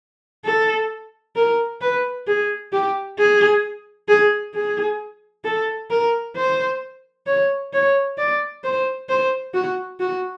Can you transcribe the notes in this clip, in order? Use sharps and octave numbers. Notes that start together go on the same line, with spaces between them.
A4
A#4
B4
G#4
G4
G#4
G#4
G#4
A4
A#4
C5
C#5
C#5
D5
C5
C5
F#4
F#4